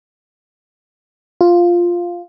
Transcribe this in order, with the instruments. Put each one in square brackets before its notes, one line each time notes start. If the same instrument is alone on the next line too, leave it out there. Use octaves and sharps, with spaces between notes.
[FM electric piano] F4